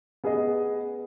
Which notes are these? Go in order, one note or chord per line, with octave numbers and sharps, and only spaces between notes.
B3 G#4 B4 D#5